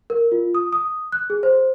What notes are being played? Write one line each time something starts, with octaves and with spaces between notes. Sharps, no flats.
A#4
F4
D#6
D#6
F#6
G#4
C5